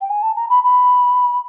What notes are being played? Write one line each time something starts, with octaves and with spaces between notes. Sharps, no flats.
G5
G#5
A5
A#5
B5
B5